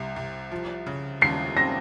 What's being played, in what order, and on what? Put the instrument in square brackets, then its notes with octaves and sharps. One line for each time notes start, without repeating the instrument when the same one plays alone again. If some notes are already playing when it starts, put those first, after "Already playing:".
Already playing: [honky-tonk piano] C2 C3
C2
F3
C#3
[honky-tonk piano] D#2 [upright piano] C7
[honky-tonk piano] C4 [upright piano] A#6